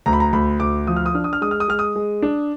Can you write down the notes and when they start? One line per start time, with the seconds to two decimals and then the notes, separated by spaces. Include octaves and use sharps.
0.06 D2 A#5
0.13 B5
0.20 A#5
0.33 D2 B5
0.60 D2 D6
0.87 F3 D#6
0.96 F6
1.06 D#6
1.15 D4 F6
1.24 D#6
1.33 F6
1.41 G#3 D#6
1.51 F6
1.60 D#6
1.68 G#3 F6
1.79 D#6
1.96 G#3
2.22 D4